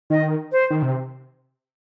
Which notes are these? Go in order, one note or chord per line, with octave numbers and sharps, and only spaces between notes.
D#3 D#5
C5
D#3
C3